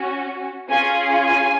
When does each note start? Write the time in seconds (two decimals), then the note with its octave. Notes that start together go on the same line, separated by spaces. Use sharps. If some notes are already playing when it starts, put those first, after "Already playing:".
Already playing: C#4 F#4
0.70 C#4 F4 G#4 G#5
1.28 G#5